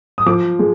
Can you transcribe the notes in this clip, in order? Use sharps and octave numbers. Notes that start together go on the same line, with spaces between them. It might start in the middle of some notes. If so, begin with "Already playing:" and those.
D#6
F3 D6
G#3